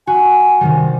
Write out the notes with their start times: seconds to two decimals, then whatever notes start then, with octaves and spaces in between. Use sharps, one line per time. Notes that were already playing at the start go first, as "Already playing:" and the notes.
0.07 F#4 G#5
0.61 C3 D#3 G3